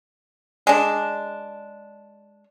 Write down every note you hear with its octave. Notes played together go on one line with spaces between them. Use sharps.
G#3 D4